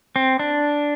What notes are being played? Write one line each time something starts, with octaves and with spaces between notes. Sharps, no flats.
C4
D4